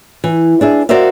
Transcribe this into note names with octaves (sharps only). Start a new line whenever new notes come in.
E3
D4 G#4 E5
F#4 A#4 C5 D5 E5 F5